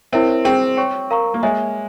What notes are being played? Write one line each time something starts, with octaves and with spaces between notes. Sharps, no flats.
C4 E4 A#4 C#5 E5
C4 G#4 C5 G5
C#5 G5 C#6
A#4 F5 A#5 C#6
A#3
G#3 C#5 E5 G#5